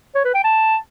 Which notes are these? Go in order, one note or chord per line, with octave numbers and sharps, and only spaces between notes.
C#5
B4
G5
A5